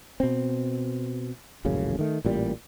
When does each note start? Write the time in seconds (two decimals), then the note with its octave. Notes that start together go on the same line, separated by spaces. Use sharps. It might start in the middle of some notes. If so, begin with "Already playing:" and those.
0.20 B2 C4
1.65 D#1 A1 F#2 C#3
1.99 D#3 A3
2.25 A1 A#2 G3